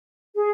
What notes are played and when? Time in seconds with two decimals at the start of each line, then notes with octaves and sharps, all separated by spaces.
0.35 G#4